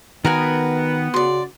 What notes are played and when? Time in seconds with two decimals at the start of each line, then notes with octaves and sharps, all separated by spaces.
0.25 D#3 B3 F#4 A#4 B4 G#5
1.14 C#3 F#4 D5 C6